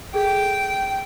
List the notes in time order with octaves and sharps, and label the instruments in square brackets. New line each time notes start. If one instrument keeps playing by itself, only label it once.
[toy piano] G#4 A4 [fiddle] G5